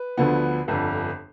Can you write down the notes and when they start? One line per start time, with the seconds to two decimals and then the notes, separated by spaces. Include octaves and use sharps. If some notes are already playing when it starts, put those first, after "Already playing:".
Already playing: B4
0.17 D2 D3 F3 B3
0.68 G1 F2 D3